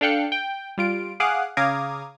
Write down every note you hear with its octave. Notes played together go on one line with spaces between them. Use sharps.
D4 A4 F5 G5 F#6 C#7
G5
G3 F4 D7
G#4 F5 F#5 D6 D#6 F#6
C#3 F5 A#5 D6 D#6 G#6